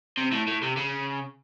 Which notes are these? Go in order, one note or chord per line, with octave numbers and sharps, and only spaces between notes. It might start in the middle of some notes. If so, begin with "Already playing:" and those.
C3
A2
A2
C3
C#3